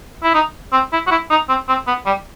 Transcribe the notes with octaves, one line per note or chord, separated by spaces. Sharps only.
E4
D#4
C4
E4
F#4
E4
D#4
C4
C4
B3
G3